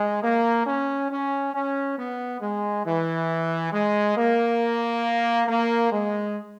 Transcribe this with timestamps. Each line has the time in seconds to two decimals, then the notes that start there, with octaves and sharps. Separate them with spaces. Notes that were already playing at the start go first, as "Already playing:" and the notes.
Already playing: G#3
0.23 A#3
0.67 C#4
1.11 C#4
1.54 C#4
1.99 B3
2.41 G#3
2.86 E3
3.73 G#3
4.17 A#3
5.48 A#3
5.92 G#3